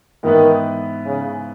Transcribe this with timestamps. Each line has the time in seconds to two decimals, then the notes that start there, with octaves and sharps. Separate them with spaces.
0.23 G#2 D#3 E3 B3 E4 B4
1.06 C#3